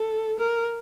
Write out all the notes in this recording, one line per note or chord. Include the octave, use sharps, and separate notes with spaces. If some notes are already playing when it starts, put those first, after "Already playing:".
Already playing: A4
A#4